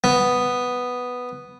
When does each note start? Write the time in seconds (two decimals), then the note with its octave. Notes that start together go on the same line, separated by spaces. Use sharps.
0.04 B3